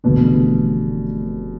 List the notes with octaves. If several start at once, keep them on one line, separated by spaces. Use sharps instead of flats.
F1 E2 B2 D3 A3